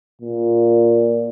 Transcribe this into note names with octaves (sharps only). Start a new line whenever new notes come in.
A#2